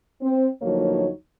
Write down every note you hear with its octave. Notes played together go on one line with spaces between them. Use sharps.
C4
D2 F3 F#3 A#3 D#4 C#5